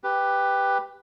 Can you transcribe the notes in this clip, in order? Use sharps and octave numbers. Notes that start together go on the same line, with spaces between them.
G4 B4